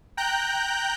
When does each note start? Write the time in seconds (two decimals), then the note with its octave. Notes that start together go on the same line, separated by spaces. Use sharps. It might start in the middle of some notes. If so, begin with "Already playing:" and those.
0.17 G5 A#5 F#6 G6